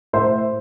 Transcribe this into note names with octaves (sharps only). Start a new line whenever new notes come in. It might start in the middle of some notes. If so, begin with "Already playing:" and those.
A2 C5 E5